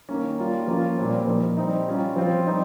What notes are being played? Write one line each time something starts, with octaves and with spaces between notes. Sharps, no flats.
D#3 A#3 C#4
G3 A#3 F4
F3 A#3 C#4 F4
A#2 G3 C4
F3 A#3 D#4
G3 C4 D#4
G3 C#4 F4
F3 C4 F4
G3 C4 D#4